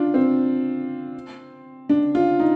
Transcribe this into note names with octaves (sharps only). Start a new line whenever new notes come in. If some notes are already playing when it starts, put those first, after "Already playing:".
Already playing: D4 F4
C4
D4
F4
D#4